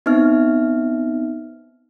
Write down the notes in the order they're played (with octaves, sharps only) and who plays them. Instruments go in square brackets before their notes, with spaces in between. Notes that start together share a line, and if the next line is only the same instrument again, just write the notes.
[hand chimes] B3 C4 D#4 E5 F6